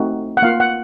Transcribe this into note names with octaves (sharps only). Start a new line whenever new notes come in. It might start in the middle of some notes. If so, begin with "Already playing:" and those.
Already playing: A3 C4 D#4 F#4
F#5
A#3 F4 F5
F#5